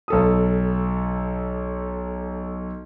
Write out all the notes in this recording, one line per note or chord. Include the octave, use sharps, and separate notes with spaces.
B1 A4 D#6